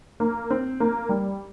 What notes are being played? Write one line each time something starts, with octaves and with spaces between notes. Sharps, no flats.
A#3
C4
A#3
G3